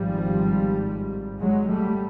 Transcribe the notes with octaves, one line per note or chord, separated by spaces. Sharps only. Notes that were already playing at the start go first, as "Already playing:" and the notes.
Already playing: G#1 G#2 F3 G3
F#3 G#3
G3 A3